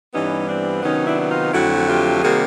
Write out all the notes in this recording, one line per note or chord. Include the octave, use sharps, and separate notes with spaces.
G2 E3 G3 B3 C#4 D#4
C4 D4
C3 D#3 F#3 B3 C#4 D#4
D4 E4
E4
D#4 F4
F2 D3 F#3 A3 E4 F#4
F#4
F4 G4
C3 D#3 G3 A#3 F#4 G#4